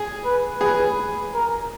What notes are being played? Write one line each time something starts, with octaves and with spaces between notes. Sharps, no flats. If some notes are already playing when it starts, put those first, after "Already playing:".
Already playing: G#4
B4
G#4 B4
A#4